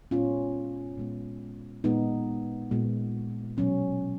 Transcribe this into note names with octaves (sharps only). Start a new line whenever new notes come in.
A#2 G#3 B3 C#4 F4
A#2 G#3 B3
A#2 G#3 B3 D#4
A#2 G#3 B3
B2 F#3 B3 C#4